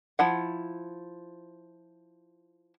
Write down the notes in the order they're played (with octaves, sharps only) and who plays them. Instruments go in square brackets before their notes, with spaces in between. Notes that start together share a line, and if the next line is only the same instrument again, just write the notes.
[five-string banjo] F3 E4 F#5